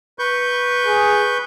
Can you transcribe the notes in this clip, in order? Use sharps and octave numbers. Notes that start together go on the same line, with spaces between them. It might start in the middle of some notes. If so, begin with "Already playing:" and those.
B4 C#6 G6
G#4